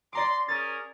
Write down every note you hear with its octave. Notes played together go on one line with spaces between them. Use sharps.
D5 A#5 C6 D6
C#4 G#4 A#4 A6